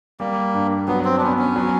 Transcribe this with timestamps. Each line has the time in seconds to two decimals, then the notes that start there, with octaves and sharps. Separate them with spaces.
0.20 G3 A#3
0.54 G2
0.88 F#3 B3
1.04 C4
1.17 D4
1.22 B3 C#4
1.38 C#4
1.56 F#3